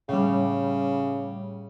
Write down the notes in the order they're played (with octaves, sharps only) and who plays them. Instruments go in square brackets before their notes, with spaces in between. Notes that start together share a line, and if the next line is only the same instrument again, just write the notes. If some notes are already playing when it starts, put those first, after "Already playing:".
[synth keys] A2 G3 [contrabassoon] C#3